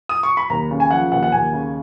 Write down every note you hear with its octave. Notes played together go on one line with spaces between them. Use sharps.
D#6
C#6
B5
D#2 A#5
C#3
G#5
F3 F#5
D#2 F#5
F#5
D#2 G#5
C#3